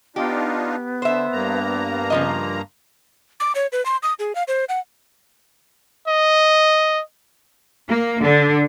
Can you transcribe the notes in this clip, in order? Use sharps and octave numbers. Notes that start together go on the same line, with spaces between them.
B3 D4 D#4 F4 G4
D3 C5 E5
G2 A#3 A#5
C#3 F3 D#5
D6
C#5
B4
C6
D#6
G#4
F5
C5
F#5
D#5
A#3
D3